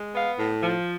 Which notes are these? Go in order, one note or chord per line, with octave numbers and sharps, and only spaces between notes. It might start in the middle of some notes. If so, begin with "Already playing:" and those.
Already playing: G#3
B3 F5
A2
F3